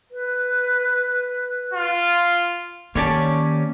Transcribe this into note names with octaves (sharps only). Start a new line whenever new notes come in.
B4
F4
D#3 A#3 C#4 G4 C#5 D5 A5